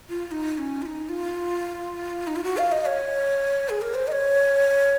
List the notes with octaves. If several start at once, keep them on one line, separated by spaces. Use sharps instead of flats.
F4
F4
D#4
D#4
C#4
F4
D#4
F4
D#4
F4
F#4
F5
D#5
C#5
G#4
A#4
C5
D#5
C#5